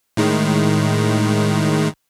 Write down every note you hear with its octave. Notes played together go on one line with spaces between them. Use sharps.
A2 D#3 G#3